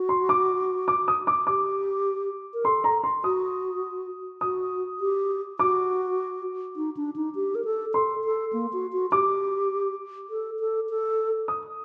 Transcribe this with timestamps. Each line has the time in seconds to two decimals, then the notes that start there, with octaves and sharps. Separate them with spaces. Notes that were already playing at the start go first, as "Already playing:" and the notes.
Already playing: F#4
0.09 C6
0.29 D6
0.88 D6
1.08 D#6
1.27 D6
1.47 G4 D6
2.54 A#4
2.65 A4 C6
2.84 A#5
3.04 C6
3.24 F#4 D#6
4.41 F#4 D#6
5.00 G4
5.59 F#4 D6
6.76 D#4
6.97 D4
7.16 D#4
7.35 G4
7.55 A#4
7.65 A4
7.94 A4 C6
8.25 A4
8.53 A#3
8.73 F#4
8.93 F#4
9.12 G4 D6
10.30 A4
10.60 A4
10.89 A4
11.48 D#6